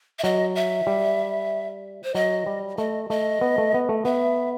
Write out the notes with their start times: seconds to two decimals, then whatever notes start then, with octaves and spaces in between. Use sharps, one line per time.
0.19 E5
0.24 F#3 D#5
0.55 E5
0.87 G3
2.04 C5
2.15 F#3 D#5
2.46 G3
2.78 A3 D#5
3.10 A3 D#5
3.41 B3
3.58 A3
3.74 B3
3.89 A3
4.05 B3 E5